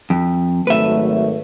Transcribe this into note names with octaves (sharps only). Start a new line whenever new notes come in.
F2
G#1 F#3 A3 B4 E5